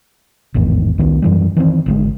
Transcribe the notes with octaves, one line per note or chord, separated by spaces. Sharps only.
A1 E2 G#2 D#3
C2 D#3 B3
F#2 E3 G3
D#3 E3 G3 C4
G#1 D3 D#3 G#3